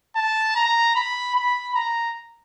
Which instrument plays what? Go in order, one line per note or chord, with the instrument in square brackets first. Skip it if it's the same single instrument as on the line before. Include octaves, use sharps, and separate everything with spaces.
[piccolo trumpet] A5
A#5
B5
B5
A#5